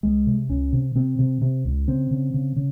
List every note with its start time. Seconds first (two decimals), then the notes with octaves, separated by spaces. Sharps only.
0.03 C#2 G#3
0.26 C3
0.49 C#2 C#4
0.73 C3
0.95 C3 C4
1.19 C3
1.41 C3
1.65 C#2
1.88 C#3 C4
2.11 C#3
2.34 C#3
2.56 C#3